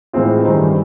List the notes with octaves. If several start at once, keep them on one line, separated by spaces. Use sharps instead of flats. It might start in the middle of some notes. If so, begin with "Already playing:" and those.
A2 E3 G#3 C4 F4
G2 D#3 G3 C4 D#4